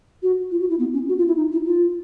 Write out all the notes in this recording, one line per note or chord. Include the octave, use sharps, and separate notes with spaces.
F#4
F4
F#4
E4
B3
C#4
F#4
F4
E4
D#4
E4
F4